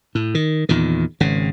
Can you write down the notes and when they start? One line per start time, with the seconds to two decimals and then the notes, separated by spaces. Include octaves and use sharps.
0.15 A2
0.35 D#3
0.69 E2 A#2 D#3
1.20 G#1 C#3